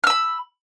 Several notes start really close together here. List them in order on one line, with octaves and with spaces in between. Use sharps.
F6 E6 B5